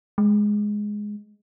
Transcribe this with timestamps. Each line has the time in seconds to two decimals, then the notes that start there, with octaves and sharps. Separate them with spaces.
0.18 G#3